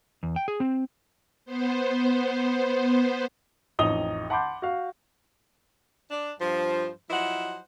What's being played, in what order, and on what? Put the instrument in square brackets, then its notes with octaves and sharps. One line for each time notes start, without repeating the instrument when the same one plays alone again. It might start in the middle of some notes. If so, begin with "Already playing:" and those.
[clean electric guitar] E2
G5
G#4
C4
[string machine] B3 C5
[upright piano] A1 F2 D#4 D#6 F7 G7
F#5 A5 B5 C6 D6 G6
F#4 F5
[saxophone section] D4
G2 F3 C5
F3 F#3 E4 C5 D#5 F#5